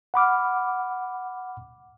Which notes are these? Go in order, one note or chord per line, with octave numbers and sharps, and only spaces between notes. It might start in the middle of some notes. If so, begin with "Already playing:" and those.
F#5 B5 D6 F6